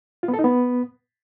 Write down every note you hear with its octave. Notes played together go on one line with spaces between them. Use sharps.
F4
B3
A4
D#4
B3